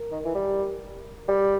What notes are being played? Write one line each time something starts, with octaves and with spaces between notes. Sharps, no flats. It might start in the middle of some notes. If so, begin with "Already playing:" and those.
Already playing: A#4
D#3
E3
G3
G3